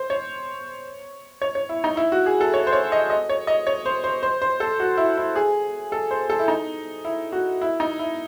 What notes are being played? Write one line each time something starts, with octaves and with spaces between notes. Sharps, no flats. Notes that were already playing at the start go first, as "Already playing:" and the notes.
Already playing: C5
C#5
C#5
C#5
E4
D#4
E4
F#4
G#4
A4
C#5
C5
C#5
D#5
D#5
C#5
D#5
C#5
C5
C5
C5
C5
A4
F#4
E4
E4
G#4
A4
C5
A4
E4
D#4
E4
F#4
E4
D#4
E4